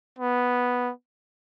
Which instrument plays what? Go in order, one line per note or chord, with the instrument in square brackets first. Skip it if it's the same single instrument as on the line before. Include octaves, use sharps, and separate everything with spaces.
[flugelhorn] B3